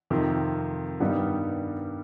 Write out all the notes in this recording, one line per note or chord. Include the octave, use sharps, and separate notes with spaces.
F2 C3 D#3
G2 D#3 G3 B3 D#4